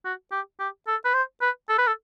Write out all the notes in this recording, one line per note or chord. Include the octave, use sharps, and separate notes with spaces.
F#4
G4
G4
A4
B4
C5
B4
A4
B4
A4